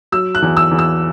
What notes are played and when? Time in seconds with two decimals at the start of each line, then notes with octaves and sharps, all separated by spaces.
0.12 F#3 E6
0.35 F#6
0.42 E2
0.57 E6
0.71 E2
0.79 E6